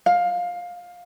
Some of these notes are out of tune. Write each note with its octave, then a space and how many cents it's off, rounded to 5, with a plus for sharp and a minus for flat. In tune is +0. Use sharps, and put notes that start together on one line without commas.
F5 +20